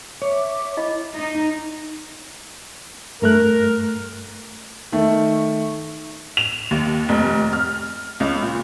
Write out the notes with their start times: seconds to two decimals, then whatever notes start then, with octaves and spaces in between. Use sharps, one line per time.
0.22 C#5 E5 D6
0.77 E4 D#5 B5
1.16 D#4
3.22 G2 A3 A#4 F#6
4.92 D#3 A3
6.37 F7
6.71 D#2
7.09 F1
7.53 F6
8.20 C#2
8.43 A#2